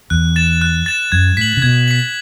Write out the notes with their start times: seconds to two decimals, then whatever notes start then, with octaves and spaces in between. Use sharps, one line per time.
0.10 E2 F#6
0.36 A6 E7
0.61 F#6
0.86 A6 E7
1.12 F#2 G#6
1.37 A2 B6 F#7
1.57 C#3
1.62 B2 G#6
1.88 B6 F#7